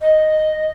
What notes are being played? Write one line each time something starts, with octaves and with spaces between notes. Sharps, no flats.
D#5